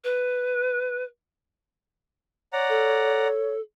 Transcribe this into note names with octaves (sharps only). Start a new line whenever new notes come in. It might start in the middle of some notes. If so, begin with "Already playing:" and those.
B4
C#5 D5 F#5 A#5
A4